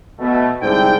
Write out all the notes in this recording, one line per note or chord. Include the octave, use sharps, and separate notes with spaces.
B2 A3
C2 G#2 D3 C4 G5